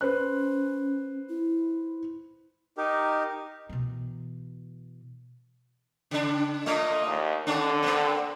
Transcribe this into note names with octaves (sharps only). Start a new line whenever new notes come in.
C#4 B4 C5 F#6
E4
D#4 G4 A#4
B2 E3
C#3 D4
A#2 A3 A#3 D#5
D#2
D3 D#3 C#4 D4
A#3 C4